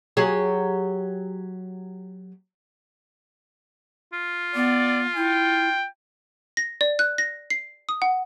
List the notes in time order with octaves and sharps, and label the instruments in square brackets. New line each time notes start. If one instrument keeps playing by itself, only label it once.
[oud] F#3 G4 G#4
[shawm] F4
[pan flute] B3 [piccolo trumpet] D5
[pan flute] E4 [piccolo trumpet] G5
[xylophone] A#6
D5
F#6
A#6
C7
D#6
F#5